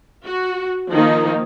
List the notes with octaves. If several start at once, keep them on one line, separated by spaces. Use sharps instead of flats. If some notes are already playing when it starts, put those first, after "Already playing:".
F#4
D#3 F3 A#3 D#4